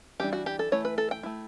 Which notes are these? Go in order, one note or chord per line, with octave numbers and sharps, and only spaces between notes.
E3 G3 D4 G4
F#4
G4
A4
E3 A3 E4 C#5
B4
A4
G5
A3 E4